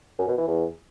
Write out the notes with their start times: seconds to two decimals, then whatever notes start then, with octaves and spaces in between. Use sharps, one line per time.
0.19 F#2
0.28 B2
0.38 E3
0.48 E2